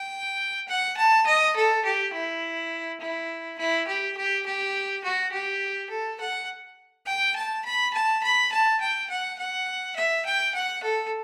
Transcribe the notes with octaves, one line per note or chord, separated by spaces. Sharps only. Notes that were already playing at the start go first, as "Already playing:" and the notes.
Already playing: G5
F#5
A5
D#5
A4
G4
E4
E4
E4
G4
G4
G4
F#4
G4
A4
F#5
G5
A5
B5
A5
B5
A5
G5
F#5
F#5
E5
G5
F#5
A4